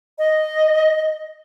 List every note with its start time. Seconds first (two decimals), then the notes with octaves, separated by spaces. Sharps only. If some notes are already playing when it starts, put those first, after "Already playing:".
0.18 D#5